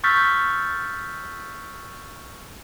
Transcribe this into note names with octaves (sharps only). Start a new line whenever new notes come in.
C#6 E6 F6 G6 A6 B6